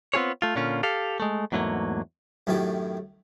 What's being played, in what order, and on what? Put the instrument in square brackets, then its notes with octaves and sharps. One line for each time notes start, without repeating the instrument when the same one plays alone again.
[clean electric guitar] B3 C4 F4 G#4 C#5
A3 F4
A#2 D3 C#4 F4
G4 A4 F5
G#3 A3
E2 G#2 F#3 A3 A#3
[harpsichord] F#2 A2 D#3 G4